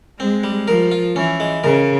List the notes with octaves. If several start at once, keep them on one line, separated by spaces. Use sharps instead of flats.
G#3 C4
G3
F3 A#4
F4
E3 C#4
G#3
C#3 A#4